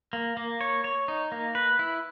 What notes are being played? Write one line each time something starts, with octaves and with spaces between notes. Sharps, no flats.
A#3
A#3
C#5
C#5
D#4
A#3
B4
E4